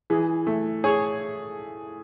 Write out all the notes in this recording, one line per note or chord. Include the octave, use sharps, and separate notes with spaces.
E3 G#4
A3
G#4 C#5